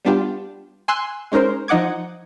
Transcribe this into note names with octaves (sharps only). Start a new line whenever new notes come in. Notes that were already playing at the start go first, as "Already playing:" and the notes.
G3 B3 D4 F4 G4
G#5 C6 E6 F#6
G#3 C#4 D#4 A#4 C5
F3 D#4 D#5 F#5 D6 G#6